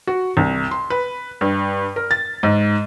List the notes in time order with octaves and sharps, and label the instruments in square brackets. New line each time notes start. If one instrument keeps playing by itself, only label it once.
[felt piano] F#4
C2
C6
B4
G2
A#4
A6
G#2